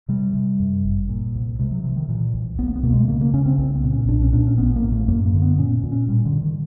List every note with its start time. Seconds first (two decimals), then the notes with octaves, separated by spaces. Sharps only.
0.09 C3 G3
0.35 C3
0.60 F#2
0.84 G1
1.09 A#2
1.35 C2
1.59 C3 G#3
1.71 F#3
1.84 C3 E3
1.96 D#3
2.09 A#2 E3
2.34 C2
2.59 C2 B3
2.67 A#3
2.76 B3
2.83 B2 A#3
2.93 G#3
3.00 A3
3.08 C#3 A#3
3.21 A#3
3.34 C#3 C#4
3.46 C4
3.58 C2 C4
3.75 B3
3.84 A#2
3.92 C#4
4.08 B1 D4
4.22 C#4
4.33 A#2 D4
4.47 C#4
4.58 A1 B3
4.76 A#3
4.84 A2
4.92 A3
5.08 F#2 A#3
5.26 A#3
5.33 D3
5.42 B3
5.58 A#2 C#4
5.84 A#2
5.92 C#4
6.08 A2 G3
6.25 D3
6.33 A2
6.41 D#3